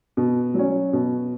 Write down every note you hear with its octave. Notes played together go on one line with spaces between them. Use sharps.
B2
F#3 C#4
B2